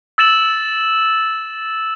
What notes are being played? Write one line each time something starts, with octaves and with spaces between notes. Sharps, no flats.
E6 A6 E7 F#7